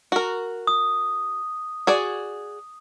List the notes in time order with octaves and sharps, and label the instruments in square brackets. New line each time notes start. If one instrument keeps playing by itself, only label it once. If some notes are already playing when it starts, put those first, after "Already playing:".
[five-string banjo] F#4 A#4
[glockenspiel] D#6
[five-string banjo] F#4 G#4 D5